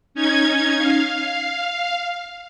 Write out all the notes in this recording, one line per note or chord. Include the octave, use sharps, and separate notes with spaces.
C#4 D#4 G#6
F5